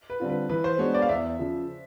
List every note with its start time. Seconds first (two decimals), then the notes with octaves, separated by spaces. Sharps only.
0.10 B4
0.20 D3 G3 C4 F4
0.29 B4
0.49 E3 B4
0.64 C5
0.79 G#3 B3 D4 F#4 C#5
0.94 D5
1.02 F5
1.09 E2 E5
1.39 C#3 F3